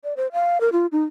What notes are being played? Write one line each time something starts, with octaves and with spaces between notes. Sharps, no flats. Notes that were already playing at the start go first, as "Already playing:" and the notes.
D5
C5
F5
A#4
F4
D#4